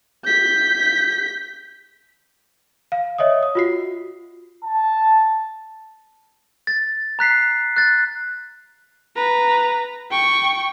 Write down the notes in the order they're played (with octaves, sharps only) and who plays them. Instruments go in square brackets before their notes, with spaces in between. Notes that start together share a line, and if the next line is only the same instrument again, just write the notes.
[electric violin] G6 B6
[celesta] F5
C#5 D#5 E5 D#6
D#6
F4 F#4 C7
[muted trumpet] A5
[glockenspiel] A6
A#5 F#6 B6 C7
F#6 A6
[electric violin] B4 A#5
G5 C#6